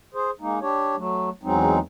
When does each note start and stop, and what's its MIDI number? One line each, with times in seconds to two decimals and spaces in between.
0.14 0.31 68
0.14 0.31 72
0.41 0.59 56
0.41 0.59 58
0.41 0.59 63
0.61 0.96 62
0.61 0.96 67
0.61 0.96 73
0.96 1.30 54
0.96 1.30 57
1.43 1.79 40
1.43 1.79 54
1.43 1.79 56
1.43 1.79 60
1.43 1.79 63